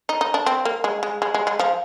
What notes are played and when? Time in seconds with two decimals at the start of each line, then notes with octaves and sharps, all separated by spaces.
0.09 D#4
0.21 D#4
0.34 D4
0.46 C4
0.65 A#3
0.84 G#3
1.03 G#3
1.22 G#3
1.34 G#3
1.47 G#3
1.59 F3